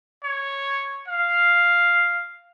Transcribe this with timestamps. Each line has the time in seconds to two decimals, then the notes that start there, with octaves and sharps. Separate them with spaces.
0.24 C#5
1.08 F5